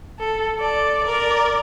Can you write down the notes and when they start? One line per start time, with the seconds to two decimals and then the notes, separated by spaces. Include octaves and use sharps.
0.19 A4
0.58 A4 D5
1.04 A#4 D5